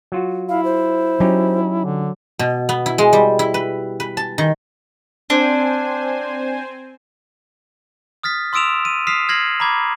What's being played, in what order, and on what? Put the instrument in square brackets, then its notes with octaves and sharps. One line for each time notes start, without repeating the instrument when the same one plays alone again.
[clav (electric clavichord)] F#3 F4 F#4
[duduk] E4 [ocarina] F5
[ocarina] C5
[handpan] F#3 [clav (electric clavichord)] C#4 D#4 G4
[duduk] D3
[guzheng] B2
B3
E4
G#3
G3
E4
B4
B4
A5
D#3
[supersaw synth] C4 C5 G#5 [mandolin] D4
[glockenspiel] D#6 F6 A6 B6
C6 D#6 E6 D7 E7 F7
D#7
D#6 F6 B6 C7 E7 F7
F6 G#6 A#6 C7 F#7
A#5 B5 D6 G#6